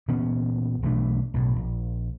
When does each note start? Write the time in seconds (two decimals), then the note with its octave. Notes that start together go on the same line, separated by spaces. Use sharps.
0.08 A#2 E3 B3 C#4
0.82 B1 E3 A3 D4
1.34 B1 A2
1.56 A#1